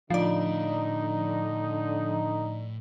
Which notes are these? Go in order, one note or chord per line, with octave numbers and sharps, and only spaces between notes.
A2 D3 F3 D#4 D5